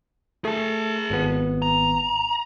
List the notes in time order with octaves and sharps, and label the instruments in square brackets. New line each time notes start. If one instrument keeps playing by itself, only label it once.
[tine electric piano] A3 [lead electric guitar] G#4 A5
[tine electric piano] G#1 B3
[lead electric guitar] A#5